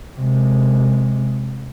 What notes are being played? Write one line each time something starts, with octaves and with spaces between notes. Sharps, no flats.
C3 G#3